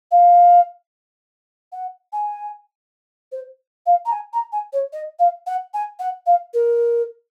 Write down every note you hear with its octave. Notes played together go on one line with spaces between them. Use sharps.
F5
F#5
G#5
C5
F5
A#5
G#5
A#5
G#5
C#5
D#5
F5
F#5
G#5
F#5
F5
A#4